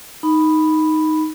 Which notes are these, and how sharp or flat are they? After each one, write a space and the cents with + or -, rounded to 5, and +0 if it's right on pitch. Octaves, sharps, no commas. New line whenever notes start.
D#4 +0 B5 +0